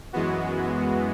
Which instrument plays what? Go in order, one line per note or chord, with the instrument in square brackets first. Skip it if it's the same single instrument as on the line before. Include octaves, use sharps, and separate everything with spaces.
[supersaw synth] F#2 E3 G#3 B3 F#4